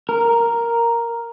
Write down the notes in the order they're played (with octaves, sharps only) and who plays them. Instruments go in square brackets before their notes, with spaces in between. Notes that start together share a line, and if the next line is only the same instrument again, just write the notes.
[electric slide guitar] A#4